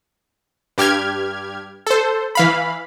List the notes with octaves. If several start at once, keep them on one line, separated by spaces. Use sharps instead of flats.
G2 G4 F6 G#6
A4 C5
E3 F5 B5